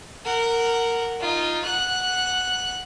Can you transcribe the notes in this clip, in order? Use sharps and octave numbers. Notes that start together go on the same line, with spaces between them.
A#4 F#5
D#4 F4
F#5 F#6